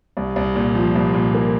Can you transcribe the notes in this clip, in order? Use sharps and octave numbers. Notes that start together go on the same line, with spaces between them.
C2
C2
A#2
F3
C2
A#2
A#3